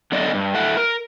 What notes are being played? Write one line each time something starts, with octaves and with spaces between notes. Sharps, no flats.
F#2 D3 B3 D5 D#5
G2
A2 A3 F#5
A#4